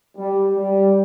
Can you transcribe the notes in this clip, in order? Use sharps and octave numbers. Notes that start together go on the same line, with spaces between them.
G3
G3